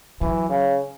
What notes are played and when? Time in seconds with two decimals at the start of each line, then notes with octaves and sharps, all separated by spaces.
0.21 E3 F#3
0.49 C#3